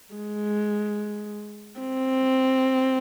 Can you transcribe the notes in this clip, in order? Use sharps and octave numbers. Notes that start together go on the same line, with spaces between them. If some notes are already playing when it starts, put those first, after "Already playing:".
G#3
C4